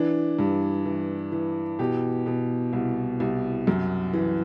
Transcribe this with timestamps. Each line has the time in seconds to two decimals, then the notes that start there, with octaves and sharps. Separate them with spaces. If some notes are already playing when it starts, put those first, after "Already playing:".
Already playing: E3 D4
0.39 G2
0.86 E3
1.32 E3
1.79 B2 G4
2.26 B2
2.73 C2
3.20 C2
3.67 F#2
4.13 E3